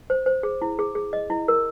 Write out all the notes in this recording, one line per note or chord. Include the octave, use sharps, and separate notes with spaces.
C5
C5
G#4
E4
G#4
G#4
D#5
E4
A#4